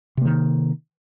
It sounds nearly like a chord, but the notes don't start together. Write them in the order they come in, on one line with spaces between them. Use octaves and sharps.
C3 A#3 D#3